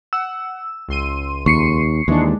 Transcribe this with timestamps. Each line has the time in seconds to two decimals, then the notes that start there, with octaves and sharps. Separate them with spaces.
0.13 F#5 E6
0.88 C#2 C6 D#7
1.46 D#2 C#6 C7 C#7
2.08 D#2 E3 G#3 D4